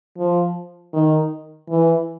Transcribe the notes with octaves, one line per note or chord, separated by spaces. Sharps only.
F3
D#3
E3